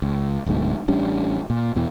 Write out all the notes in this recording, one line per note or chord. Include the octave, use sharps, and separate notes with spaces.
C#2
D1 D2 G#2 B2
A1 G3 C#4 D4
A#2
E2 B2 E3